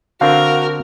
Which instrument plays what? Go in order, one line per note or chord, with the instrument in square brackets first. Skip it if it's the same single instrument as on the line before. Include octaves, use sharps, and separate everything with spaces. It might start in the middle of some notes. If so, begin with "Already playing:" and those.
[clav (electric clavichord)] D3 C4 D4 [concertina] F#4 [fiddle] A#4 [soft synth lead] F5